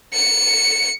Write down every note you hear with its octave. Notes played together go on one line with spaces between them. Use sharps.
C#7